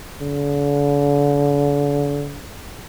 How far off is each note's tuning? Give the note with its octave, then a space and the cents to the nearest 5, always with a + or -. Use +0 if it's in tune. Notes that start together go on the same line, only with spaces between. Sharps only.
D3 -40